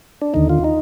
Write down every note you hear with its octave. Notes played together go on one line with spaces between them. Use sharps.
D4
D#2 D3 D#4
F4
D#4